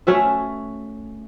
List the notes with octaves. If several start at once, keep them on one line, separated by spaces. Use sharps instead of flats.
A3 C#4 F#4 E5